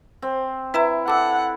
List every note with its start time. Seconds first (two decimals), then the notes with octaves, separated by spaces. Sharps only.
0.22 C4
0.74 E4 B4 E5 A#5
1.08 A4 F#5 D6 E6